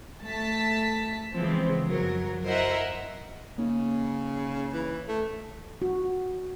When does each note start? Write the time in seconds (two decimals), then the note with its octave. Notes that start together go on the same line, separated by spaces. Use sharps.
0.24 A3 A5 B6
1.37 C#3 E3 F3 G#3 B3 C4
1.88 F#2 F#3 A#4
2.44 E4 A#4 C5 D#5 E5 F#5
3.58 C#3 A#3 D#4
4.73 E3
5.08 A3
5.82 F#4